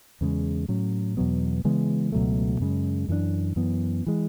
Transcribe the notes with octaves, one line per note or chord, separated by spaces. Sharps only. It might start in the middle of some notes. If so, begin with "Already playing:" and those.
E2 C#3 G#3
A2 F#3 C#4
E2 B2 F#3 B3
C#3 E3 G#3 B3
C#2 B2 F#3 A3
F#2 C#3 G#3
F#2 E3 G#3 D4
F#2 E3 B3
E3 G#3